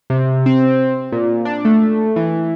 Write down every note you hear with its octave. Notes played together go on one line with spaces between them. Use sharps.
C3
C4
A#2
D4
A3
E3